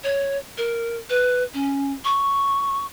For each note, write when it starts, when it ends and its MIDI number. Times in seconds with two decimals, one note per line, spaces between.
0.04 0.37 73
0.57 0.96 70
1.10 1.43 71
1.53 1.93 61
2.04 2.84 85